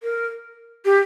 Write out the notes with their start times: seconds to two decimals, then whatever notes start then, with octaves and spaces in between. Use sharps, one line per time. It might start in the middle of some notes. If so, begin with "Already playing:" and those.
0.03 A#4
0.85 G4